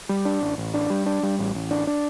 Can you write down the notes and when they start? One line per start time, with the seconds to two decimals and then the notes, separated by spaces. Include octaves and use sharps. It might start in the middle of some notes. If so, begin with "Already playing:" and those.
0.09 G3
0.25 D4
0.41 A1
0.58 A1
0.74 D4
0.90 G3
1.06 D4
1.23 G3
1.39 A1
1.55 A1
1.71 D4
1.87 D4